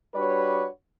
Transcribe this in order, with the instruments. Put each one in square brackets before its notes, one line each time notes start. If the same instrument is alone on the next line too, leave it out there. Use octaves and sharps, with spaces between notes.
[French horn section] G3 D4 F#4 B4 C#5